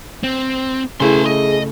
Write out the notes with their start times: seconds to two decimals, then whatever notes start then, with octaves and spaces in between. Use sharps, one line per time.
0.23 C4
1.00 C#3 A3 E4 G#4 B4 C6
1.26 G#4 D#5